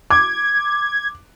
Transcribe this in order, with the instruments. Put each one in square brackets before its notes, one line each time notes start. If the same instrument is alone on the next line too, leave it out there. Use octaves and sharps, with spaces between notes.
[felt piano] D6 [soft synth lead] G#6